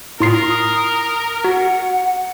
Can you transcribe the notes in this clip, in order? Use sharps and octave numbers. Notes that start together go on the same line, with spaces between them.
A2 F4 A#4 D#6 C7
F#4 F#5